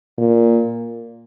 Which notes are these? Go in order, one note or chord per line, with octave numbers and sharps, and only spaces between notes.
A#2